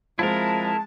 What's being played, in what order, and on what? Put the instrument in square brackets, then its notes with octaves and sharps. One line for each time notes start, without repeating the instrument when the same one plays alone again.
[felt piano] F3 C4 [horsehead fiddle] G#3 [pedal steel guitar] E4 A#4 [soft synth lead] A5